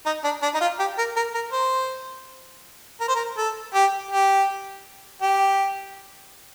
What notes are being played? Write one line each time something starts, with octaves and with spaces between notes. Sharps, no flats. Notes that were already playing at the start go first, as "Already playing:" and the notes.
D#4
D4
D4
D#4
F4
G4
A#4
A#4
A#4
C5
A#4
C5
A#4
A4
G4
G4
G4